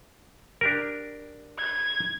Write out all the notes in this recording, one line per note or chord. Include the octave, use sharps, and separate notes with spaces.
D4 G4 A#4
G#6